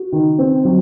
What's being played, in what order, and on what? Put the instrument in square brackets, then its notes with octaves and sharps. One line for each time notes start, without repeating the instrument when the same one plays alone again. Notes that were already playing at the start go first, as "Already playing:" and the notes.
Already playing: [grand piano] F#4
D#3
C4
F#3